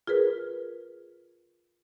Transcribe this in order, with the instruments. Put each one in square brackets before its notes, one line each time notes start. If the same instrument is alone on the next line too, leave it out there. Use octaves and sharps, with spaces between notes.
[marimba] F4 G#4 A#4 B4